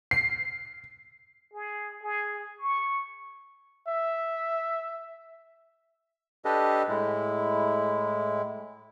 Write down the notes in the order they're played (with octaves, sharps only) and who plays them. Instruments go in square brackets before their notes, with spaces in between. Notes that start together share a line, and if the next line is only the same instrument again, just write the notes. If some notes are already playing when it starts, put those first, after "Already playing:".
[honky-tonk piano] C7
[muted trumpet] G#4
G#4
C#6
[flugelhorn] E5
[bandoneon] D4 G4 A4 B4 D#5
A2 G#3 E4